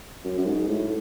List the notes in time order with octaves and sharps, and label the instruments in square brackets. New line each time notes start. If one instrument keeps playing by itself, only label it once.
[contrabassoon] F#2
F#2
G#2
A2